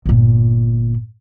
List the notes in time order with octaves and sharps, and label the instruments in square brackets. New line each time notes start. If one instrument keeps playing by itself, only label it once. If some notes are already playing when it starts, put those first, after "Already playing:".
[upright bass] G1 A#2